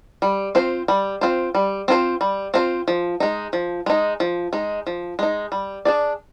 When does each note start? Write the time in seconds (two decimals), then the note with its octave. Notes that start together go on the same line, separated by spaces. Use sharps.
0.22 G3
0.55 C4 F4 C5
0.88 G3
1.21 C4 F4 C5
1.55 G3
1.88 C4 F4 C5
2.21 G3
2.54 C4 F4 C5
2.88 F3
3.20 G#3 D#4
3.53 F3
3.86 G#3 D#4
4.20 F3
4.53 G#3 D#4
4.87 F3
5.19 G#3 D#4
5.52 G3
5.85 D4 G#4 D5